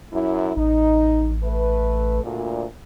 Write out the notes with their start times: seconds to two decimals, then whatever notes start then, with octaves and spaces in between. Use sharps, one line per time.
0.13 F#2 E4
0.56 A1 D#4
1.44 A3 B4
2.24 D2 A#2